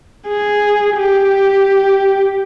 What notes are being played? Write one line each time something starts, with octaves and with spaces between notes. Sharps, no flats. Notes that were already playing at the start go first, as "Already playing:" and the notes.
G#4
G4